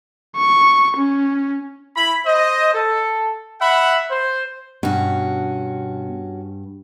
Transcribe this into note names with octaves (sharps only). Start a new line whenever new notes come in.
C#6
C#4
E4 B5
C5 D#5
A4
E5 F#5 B5
C5
G2 B2 C#4 F#4